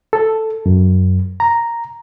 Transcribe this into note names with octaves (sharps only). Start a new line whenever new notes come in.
A4
F#2
A#5